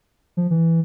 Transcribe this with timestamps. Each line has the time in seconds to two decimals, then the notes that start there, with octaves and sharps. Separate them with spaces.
0.37 F3
0.51 E3